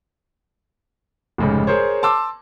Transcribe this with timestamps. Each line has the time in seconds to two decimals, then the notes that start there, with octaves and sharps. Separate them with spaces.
1.38 F1 G#2 C#3
1.67 G#4 A#4 C5 C#5
2.03 A5 C6 D6 E6